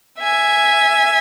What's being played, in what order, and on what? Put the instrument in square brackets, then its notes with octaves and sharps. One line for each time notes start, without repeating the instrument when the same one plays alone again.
[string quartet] E5 G#5